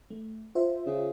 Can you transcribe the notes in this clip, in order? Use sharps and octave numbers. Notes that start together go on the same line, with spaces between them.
A3
F4 C5 E5
C#3